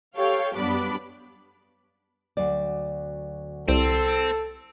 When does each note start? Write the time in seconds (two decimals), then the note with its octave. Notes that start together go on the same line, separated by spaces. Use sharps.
0.16 G4 A4 C#5 F5 G5
0.54 F#2 G3 B3 D4 B5 D6
2.37 D2 F#3 D5
3.68 C2 C4 A4